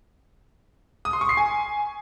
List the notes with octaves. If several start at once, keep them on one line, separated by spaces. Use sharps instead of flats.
D#6
C6
C#6
C7
G#5